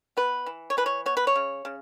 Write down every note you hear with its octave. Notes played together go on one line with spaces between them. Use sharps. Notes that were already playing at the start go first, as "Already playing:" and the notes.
B3 B4
E3
C#5
E3 B4
C#5
B3 C#5
B4
C#5
C#3
C#3